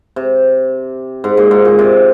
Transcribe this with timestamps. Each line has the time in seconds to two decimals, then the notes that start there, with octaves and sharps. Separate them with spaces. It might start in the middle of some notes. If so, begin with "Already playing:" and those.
0.16 C3
1.24 G#2
1.37 A#2
1.51 G#2
1.65 A#2
1.79 C3